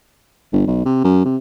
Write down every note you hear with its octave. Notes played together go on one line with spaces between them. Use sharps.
G1
B1
C3
F#2
C3